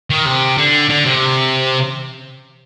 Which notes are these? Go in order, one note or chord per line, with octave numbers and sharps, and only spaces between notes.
D#3
C3
D3
D3
C3